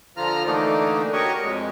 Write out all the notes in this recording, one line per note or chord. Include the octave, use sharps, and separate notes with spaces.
D3 F3 F4 A#5 F6
D3 E3 A3 A#3 D4 D#4
F#4 G4 A#4 C#5 D#5 C#6
F2 G#3